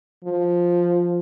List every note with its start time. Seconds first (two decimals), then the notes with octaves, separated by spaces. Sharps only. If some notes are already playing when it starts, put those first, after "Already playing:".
0.24 F3